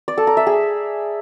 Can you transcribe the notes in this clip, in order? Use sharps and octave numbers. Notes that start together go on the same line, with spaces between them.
D5
A4
A#5
E5
G#4